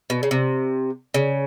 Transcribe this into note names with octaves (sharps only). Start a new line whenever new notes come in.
B2
C#3
C3
C#3